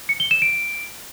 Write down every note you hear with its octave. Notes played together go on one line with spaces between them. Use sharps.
C#7
G7
E7
D7